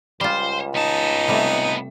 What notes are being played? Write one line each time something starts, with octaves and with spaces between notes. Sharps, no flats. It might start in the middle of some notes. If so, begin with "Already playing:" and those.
C#2 G3 F4 C5
B3 D#4 A5
C3 G3 A3